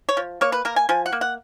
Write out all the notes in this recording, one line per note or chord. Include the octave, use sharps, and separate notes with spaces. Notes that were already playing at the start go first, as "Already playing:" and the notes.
C#5
F3
A#3 C#5
B4
A#3 A#4
G#5
F3 G#5
F#5
A#3
F#5